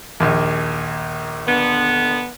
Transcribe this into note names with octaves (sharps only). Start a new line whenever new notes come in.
A#1 D#2
D3 B3